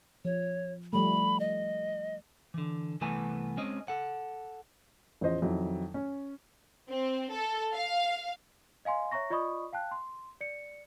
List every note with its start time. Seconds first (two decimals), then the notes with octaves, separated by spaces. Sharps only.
0.25 F3 C#5
0.93 F3 G3 A3 B5
1.40 D#5
2.54 D3 E3
3.01 C2 E3 A3 B3 B4 G#5
3.57 G#3 C4 C#4 D#5
3.88 A4 F#5
5.21 A1 E2 F3 C5 D#5
5.42 F2 D#3 F#3 E4
5.94 C#4
6.90 C4
7.34 A4
7.74 F5
8.85 D#5 F5 G#5 C6
9.11 C#5 E5 A#5 C#6 A#6
9.30 F4 D5 D#5 B5 C#6 D#6
9.73 F5 G5 A5 F#6
9.91 C6
10.41 D5 C#7